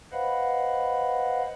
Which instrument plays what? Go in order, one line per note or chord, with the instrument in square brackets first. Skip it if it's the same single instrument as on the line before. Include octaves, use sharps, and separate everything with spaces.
[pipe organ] B4 C5 D#5 F5 F#5 B5